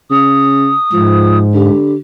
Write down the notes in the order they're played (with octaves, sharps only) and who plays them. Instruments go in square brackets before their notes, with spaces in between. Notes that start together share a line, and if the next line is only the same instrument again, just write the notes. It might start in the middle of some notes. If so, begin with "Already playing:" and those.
[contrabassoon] C#3 [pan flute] D#6
[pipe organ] G#2 [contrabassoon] F3
[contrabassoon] D3 [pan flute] G4